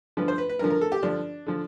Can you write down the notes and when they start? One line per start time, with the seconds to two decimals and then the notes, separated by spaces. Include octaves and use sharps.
0.17 G2 D3 F3 B4
0.28 C5
0.38 B4
0.49 B4
0.59 G2 D3 F3 A#4
0.70 A#4
0.81 A4
0.92 G4
1.02 G2 D3 F3 D4
1.46 D3 F3